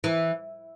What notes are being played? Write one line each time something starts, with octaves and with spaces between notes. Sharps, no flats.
E3